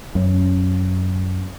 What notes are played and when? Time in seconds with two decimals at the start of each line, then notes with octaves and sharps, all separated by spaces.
0.15 F#2 C#4